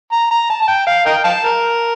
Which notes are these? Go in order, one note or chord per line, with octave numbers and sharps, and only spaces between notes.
A#5
A#5
A5
A5
G5
F5
A#4 D#5 G5
F5 A5
A#4